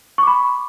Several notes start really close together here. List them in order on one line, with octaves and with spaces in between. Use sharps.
C#6 D6 B5